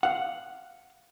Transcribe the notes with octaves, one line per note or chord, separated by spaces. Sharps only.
F5 F#5